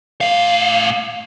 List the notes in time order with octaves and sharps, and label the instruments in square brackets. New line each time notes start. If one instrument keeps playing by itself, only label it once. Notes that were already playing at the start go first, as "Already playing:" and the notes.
[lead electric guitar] A2 F5